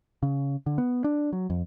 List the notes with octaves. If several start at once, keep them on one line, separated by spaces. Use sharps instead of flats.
C#3
D3
B3
D4
F#3
F2